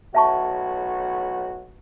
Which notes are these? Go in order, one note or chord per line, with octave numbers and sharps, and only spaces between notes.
B1 A2 F#4 E5 A5 C#6